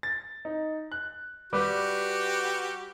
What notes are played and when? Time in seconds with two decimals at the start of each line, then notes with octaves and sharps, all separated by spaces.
0.03 A6
0.45 D#4
0.92 F#6
1.53 G3 F#4 G4 B4 D6